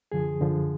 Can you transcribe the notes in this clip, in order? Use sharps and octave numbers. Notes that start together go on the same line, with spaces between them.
F#2 D3 F3 G#4
F#2 D3 F3